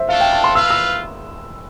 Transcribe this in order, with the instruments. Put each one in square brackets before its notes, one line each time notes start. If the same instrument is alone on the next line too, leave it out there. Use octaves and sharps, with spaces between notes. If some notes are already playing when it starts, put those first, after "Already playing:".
Already playing: [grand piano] C5 E5
[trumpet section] A3 D4 F4 A4 [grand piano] F5
[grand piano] G5
A5
C6
[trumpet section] F4 B4 F5 [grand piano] E6
[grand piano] E6